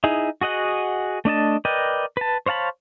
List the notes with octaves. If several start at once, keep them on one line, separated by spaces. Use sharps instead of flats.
D#4 E4 G#4
F#4 G#4 D#5 F#5
A3 D4 D#5 A5
A#4 B4 D5 D#5 G5
B4 A5
C5 C#5 F5 A5 B5